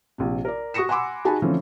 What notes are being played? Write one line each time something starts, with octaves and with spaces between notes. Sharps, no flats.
A#1 C3
A#4 D5
F#4 C#6 D#6 A#6 C#7 E7
F#5 G#5 B5 C6 D6 E6
D#4 F#4 G#4 G#5 A5 B5
D3 E3 F3 A3 C4 C#4